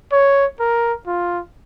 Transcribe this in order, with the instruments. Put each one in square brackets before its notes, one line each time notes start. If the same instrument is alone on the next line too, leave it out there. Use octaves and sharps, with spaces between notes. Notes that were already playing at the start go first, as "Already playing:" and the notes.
[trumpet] C#5
A#4
F4